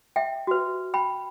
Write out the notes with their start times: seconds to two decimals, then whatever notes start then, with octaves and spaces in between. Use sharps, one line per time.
0.16 E5 G5
0.47 F#4 B4
0.94 G5 B5